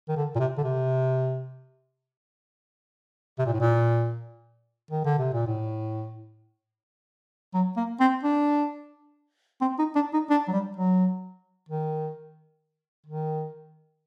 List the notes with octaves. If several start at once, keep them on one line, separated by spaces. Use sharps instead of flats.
D#3
D3
A#2
C3
D3
C3
C3
A#2
A2
A#2
D#3
D3
C3
A#2
A2
F#3
A#3
C4
D4
C4
D#4
D4
D#4
D4
F#3
G3
F#3
D#3
D#3